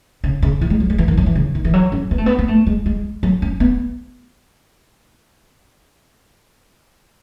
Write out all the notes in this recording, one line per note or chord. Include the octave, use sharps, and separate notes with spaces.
C#3
C#3
E3
G#3
F#3
G#3
E3
D#3
F#3
E3
C#3
D#3
E3
F#3
C#4
B3
A3
B3
B3
A3
G#3
G#3
F#3
C#4
B3